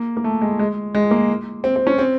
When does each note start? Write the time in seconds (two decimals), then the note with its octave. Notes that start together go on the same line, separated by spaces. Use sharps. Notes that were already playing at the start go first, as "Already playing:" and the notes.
Already playing: A#3
0.17 A#3
0.24 A3
0.42 G#3
0.59 G#3
0.95 G#3
1.11 A#3
1.64 C4
1.76 C4
1.87 C#4
1.98 C4